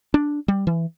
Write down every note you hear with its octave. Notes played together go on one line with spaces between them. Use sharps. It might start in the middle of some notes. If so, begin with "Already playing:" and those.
D4
G3
E3